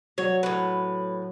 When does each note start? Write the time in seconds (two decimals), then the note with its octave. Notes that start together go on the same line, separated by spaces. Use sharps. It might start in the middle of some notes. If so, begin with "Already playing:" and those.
0.18 F#3 C#5
0.43 A2 B4